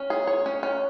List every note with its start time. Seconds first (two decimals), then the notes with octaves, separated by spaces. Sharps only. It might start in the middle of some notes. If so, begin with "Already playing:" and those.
Already playing: C#4
0.10 G#4
0.27 C#5
0.46 C#4
0.63 C#4